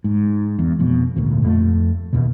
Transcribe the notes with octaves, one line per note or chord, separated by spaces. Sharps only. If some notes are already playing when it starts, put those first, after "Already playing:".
G#2
E2
F1 F2 B2
D#1 G#1 D2 A#2
F2 G3 A3
D#2 B2